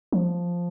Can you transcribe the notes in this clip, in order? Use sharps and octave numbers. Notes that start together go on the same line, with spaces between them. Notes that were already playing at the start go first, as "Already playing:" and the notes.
F3